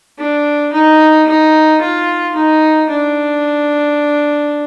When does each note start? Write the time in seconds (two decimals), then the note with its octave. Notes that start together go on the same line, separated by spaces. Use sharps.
0.18 D4
0.72 D#4
1.27 D#4
1.81 F4
2.35 D#4
2.89 D4